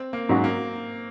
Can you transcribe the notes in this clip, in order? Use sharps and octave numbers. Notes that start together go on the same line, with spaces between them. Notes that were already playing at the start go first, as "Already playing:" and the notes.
Already playing: C4
A#3
G#2 F#3 C#4 F#4
A#3